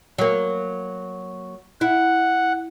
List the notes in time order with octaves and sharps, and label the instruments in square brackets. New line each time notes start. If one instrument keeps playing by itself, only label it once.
[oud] F#3 A#3
[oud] E4 [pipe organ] F#5